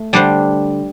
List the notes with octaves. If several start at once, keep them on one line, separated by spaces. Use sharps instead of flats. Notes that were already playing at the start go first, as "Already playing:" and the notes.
Already playing: A3
D3 G3 D4 C5